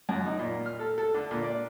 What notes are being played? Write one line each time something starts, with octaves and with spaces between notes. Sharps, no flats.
F#2
D#4
A#2
F6
A4
A4
D3
A#2
D5